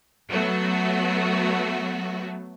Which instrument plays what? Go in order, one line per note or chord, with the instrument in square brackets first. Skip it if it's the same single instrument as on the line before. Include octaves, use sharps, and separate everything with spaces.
[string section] F#3 A3 B3 F#4